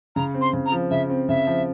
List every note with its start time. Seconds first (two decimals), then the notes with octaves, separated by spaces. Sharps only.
0.16 C#3 A#5
0.34 C4
0.41 C6
0.53 C#3
0.66 A#5
0.72 F3
0.91 C#3 E5
1.10 C4
1.29 C#3 E5
1.47 F3